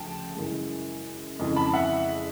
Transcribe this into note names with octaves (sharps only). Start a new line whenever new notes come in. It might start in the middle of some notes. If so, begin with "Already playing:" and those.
Already playing: D2 C#3 F3 G5 A5
F#2 C#3 E3 G#3
F2 C#3 E3 G#3
A5 B5
E5 F#5